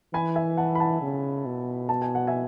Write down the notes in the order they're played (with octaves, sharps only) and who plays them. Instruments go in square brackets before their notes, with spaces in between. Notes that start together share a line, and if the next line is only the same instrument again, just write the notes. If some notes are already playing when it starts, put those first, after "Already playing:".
[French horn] E3 [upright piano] G#5 B5
[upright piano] E5 G#5
F#5 A5
B5
F#5 A5
[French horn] C#3
B2
[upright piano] A5
G#5
F#5
E5 G#5